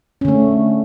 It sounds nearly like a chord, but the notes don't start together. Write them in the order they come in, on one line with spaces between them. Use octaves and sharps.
C#4 D3 A3